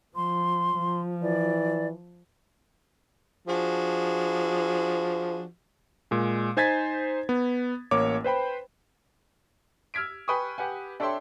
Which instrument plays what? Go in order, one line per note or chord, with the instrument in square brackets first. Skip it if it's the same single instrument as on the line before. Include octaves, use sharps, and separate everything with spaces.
[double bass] F3 [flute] C6
[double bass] F3
[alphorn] E3 [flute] D5
[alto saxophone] F3 [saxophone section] D4 F#4 G#4
[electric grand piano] A#2 G#3
D#4 C5 G#5 G#6 A6 B6
B3
A1 A#3 C#5 D6
B4 C5 G5 B5
[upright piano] E6 F6 G#6 B6 D7
B4 G5 G#5 B5 C#6 D#6
G4 B4 F#5 G#5
D4 A4 C#5 E5 G5 C6